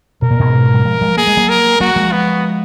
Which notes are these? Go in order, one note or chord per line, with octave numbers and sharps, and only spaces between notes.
B2 A#4
A#2
G#2 B2
F#3
F3 G#3
F3 G#3
A#3 G#4
G#3
F#3 A#3
A#4
F#3 A#3 F#4
F3 G#3
B3